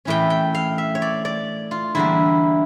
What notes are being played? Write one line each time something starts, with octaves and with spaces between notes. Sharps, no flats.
A2 E3 A3 C#4 E4 G5
G5
F5
E5
C#5
D5
D5
F4
E2 D3 G3 A#3 E4